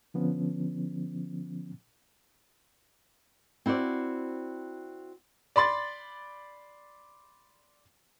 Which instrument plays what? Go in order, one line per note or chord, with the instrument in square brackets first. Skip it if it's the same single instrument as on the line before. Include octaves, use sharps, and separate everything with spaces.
[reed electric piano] D3 F3 B3 C#4
[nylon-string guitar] C4 E4 F#4 C5 D5
[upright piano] D5 B5 C6 A6